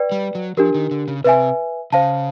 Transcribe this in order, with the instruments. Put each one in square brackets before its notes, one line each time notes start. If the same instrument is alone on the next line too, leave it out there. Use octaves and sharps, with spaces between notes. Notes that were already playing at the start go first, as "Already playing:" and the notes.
Already playing: [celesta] B4 D5 G5
[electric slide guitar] G3
F#3
[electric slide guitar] F3 [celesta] D4 G4 A#4
[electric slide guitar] D#3
D3
C#3
[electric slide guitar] C3 [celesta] B4 E5 G#5
[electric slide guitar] C#3 [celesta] C5 F5 A5